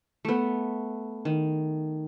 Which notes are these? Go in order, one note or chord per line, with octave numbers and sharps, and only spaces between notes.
A3 B3
D#3